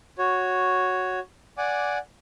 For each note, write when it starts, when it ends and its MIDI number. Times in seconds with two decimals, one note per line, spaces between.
0.18 1.19 66
0.18 1.19 73
1.58 1.98 74
1.58 1.98 78
1.58 1.98 80
1.58 1.98 86